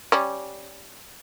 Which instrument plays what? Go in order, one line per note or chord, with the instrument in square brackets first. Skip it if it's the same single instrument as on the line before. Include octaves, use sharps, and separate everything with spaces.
[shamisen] G3 C#4